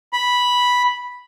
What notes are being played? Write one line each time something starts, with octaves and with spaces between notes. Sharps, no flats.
B5